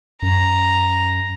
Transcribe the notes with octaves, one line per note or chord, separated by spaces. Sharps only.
F#2 A#5